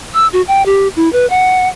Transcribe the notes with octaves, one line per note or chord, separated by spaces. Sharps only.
E6
F#4
G5
G4
E4
B4
F#5